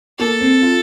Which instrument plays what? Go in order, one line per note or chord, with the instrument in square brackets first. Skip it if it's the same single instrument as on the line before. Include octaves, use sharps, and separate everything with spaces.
[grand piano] A#3 [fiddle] A4
[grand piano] C4
F4